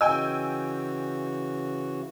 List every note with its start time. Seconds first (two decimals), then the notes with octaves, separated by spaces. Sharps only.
0.01 C#3 E3 F#4 D#5 G5 G#5 E6